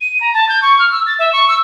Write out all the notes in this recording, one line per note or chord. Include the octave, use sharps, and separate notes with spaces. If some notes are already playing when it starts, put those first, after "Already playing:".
D#7
A#5
A5
G6
C#6
F6
E6
A6
E5
C#6
E6